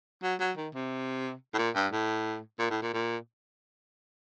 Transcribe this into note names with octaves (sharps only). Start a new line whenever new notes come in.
F#3
F#3
D#3
C3
A2
A#2
G2
A2
A#2
A2
A#2
A#2